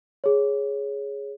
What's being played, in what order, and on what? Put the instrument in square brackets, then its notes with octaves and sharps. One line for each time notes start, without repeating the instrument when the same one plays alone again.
[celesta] G#4 C#5